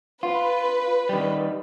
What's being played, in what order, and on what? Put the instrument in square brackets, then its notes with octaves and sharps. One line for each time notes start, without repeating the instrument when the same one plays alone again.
[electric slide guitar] F4 [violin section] B4
[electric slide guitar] D#3 G3